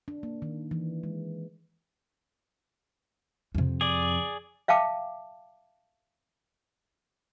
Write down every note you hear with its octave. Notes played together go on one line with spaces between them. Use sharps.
D4
A#3
D#3
E3
G#3
F2 C3
G#4 D5
E5 F5 G5 A5 D6